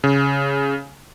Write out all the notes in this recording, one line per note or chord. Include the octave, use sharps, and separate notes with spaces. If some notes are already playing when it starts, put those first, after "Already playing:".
C#3